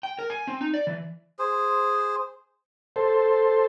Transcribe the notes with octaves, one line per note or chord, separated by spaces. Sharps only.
G5
A#4
G#5
C4
D#4
D5
E3
G#4 C5
A4 C5